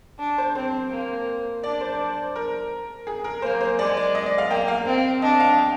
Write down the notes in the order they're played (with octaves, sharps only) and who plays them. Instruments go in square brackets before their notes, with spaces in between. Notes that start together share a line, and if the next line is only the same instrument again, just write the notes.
[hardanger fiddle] D4
[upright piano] C5
[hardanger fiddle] C4 [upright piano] C5
[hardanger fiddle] A#3
[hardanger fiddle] D4 [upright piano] D5
[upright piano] C5
A#4
G#4
A#4
[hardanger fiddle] A#3 [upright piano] C5
[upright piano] C5
[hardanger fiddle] G#3 [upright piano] D5
[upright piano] D5
D#5
D5
F5
[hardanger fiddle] A#3 [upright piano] G5
[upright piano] F5
[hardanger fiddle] C4
[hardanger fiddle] D4 [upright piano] D#5
[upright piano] F5
G5